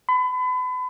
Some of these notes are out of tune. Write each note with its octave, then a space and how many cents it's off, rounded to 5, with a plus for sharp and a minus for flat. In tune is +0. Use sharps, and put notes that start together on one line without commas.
B5 +35